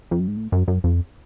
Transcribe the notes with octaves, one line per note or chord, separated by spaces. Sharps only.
F2
F#2
G#2
A2
F#2
F#2
F2